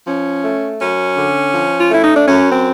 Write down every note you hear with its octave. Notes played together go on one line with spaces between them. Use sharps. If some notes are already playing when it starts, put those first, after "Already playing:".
F3 C#4
A3
F#2 C#4
D3
F3
F4
A3 E4
D#4
D4
F#2 C#4
C4